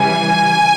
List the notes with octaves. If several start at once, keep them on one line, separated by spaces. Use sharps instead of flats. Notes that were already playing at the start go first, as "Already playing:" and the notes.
Already playing: C#3 E3 G3 G#5